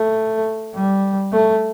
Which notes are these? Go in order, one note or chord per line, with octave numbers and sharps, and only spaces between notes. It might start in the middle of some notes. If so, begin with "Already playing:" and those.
Already playing: A3
G3
A3